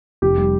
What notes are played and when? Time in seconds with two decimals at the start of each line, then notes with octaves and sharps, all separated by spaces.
0.22 F1 G4
0.37 G3